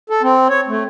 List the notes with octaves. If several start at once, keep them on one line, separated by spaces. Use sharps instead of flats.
A4
C4
C#5
A3